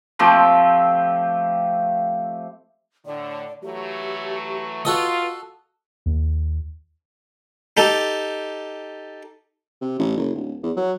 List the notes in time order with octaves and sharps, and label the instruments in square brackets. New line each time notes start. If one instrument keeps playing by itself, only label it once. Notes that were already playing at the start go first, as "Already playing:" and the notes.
[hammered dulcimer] F3 A3 C4 G4
[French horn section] A2 D3 [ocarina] D5
[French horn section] E3 F#3 A3 [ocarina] G4
[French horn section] F4 [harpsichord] F#4 A4 D#5 [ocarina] B4
[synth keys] D#2
[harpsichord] D#4 G4 A4
[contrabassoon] C3
A1
F#1
D1
E2
F#3